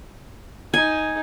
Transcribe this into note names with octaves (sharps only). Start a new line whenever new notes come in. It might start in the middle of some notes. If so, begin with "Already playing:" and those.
D#4 G#5